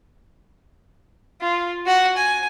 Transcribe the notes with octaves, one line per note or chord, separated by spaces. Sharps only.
F4
F#4 F#5
G#5